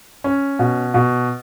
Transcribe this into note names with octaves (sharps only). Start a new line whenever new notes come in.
C#4
B2
B2